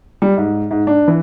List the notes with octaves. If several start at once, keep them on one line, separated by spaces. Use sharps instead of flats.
G3
G#2
G#2
D4
E3